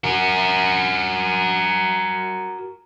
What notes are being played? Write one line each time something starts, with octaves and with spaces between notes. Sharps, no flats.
F#4 A#4